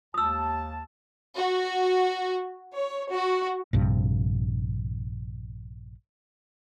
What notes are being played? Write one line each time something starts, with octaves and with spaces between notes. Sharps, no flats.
D#2 A5 D#6 E6
F#4
C#5
F#4
A#1 G2 C3